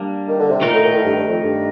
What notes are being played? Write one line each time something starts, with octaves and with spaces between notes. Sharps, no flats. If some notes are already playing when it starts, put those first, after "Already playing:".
Already playing: G3 A#3 D4
D#3
D3
C3
A#2 D#3 A3 D#4 A#4
A2
A#2
A2
G2
G2
F2
G2